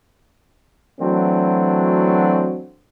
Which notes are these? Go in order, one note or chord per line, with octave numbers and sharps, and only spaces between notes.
E3 F#3 A3 C4 D4 F#4